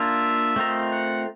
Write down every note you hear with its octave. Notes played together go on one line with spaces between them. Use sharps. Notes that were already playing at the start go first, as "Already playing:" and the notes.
Already playing: A#3 D4 F4 E5
A3 C4 F4 A#4 D#5
F#5